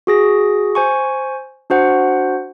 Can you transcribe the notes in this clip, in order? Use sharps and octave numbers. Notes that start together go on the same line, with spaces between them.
F#4 G#4 A#6
C5 G#5 C#6
D4 F#4 C5 F#5